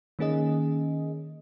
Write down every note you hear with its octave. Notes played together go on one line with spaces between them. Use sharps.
D#3 A#3 C#4 G#4 D#5